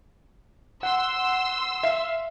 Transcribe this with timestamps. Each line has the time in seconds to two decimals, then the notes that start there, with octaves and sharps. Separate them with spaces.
0.83 F#5 C6 E6
1.83 E5 F5 C7